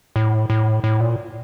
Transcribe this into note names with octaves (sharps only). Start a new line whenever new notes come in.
A2
A2
A2
A#2